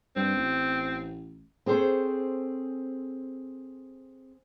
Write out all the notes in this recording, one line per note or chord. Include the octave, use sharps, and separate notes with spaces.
G2 C4
A1
C4 G#4 A4 C5 C#5